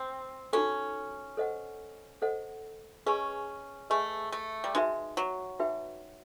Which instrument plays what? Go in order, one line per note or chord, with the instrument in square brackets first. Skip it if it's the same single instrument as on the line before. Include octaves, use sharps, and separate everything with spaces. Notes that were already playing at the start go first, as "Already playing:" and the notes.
Already playing: [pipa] C4
[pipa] C#4 [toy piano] D#4 F#4 A4
[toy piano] A4 C5 D#5 F#5
A4 C5 D#5 F#5
[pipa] C#4 [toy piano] G#4 B4 D#5 G#5 C#6
[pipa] A3 [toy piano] G#4 B4 D#5 G#5 C#6
[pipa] A3
G3
[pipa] G#3 [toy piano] D#4 F#4 B4 E5 G5
[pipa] F#3
[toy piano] D#4 F#4 B4 E5 G5